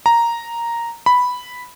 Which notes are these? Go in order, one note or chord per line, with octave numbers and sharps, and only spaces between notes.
A#5
B5